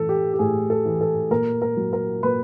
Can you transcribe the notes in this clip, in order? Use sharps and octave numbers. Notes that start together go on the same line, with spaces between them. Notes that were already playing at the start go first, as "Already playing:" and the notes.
Already playing: A2 E3 A4
G4
G4
A2 G#4
A4
E3
A4
A#2 A#4
A#4
F#3
A#4
A#2 B4